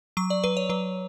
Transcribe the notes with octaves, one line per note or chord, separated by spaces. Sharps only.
F#3 C#6
D5
F#3 B4
C#5
F#3 B4